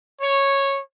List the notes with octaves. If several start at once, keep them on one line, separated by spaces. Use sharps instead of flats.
C#5